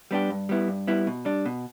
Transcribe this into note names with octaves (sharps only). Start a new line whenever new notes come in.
G3 B3 D4 G4
G2
G3 B3 E4
G2
G3 B3 E4
B2
G3 D4
B2